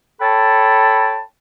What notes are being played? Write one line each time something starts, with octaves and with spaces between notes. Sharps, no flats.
A4 C#5 G5 A5 B5